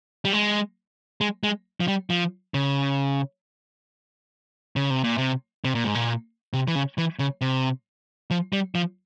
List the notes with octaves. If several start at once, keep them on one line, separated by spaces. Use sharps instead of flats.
G3
G#3
G#3
G#3
F3
G3
F3
C#3
C#3
C3
A#2
C3
C3
A#2
G#2
A#2
C3
E3
C#3
E3
C#3
C3
F3
G3
F3